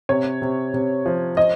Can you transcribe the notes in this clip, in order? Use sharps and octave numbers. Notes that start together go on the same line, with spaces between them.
C3 C#5
C3
C3
F3
F3 D#5